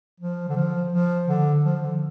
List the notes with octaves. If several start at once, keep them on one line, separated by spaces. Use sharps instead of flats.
F3
D3
F3
F3
D3
F3
D3